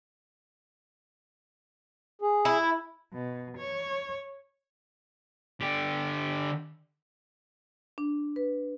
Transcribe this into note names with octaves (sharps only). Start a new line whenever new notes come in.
G#4
E4
B2
C#5
D3 G4
D4
B4